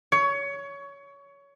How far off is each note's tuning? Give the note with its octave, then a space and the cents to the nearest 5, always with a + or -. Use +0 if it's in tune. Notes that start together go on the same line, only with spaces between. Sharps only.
C#5 +20